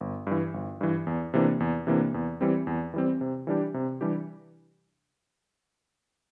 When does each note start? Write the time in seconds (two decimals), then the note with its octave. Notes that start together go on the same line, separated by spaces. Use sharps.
0.01 G1
0.27 G2 E3
0.54 G1
0.81 G2 E3
1.07 E2
1.34 C3 E3 A#3 D4
1.60 E2
1.87 C3 E3 A#3 D4
2.14 E2
2.41 E3 G3 C4
2.67 E2
2.94 E3 G3 C4
3.21 C3
3.47 E3 G3 D4 G4
3.74 C3
4.01 E3 G3 D4 G4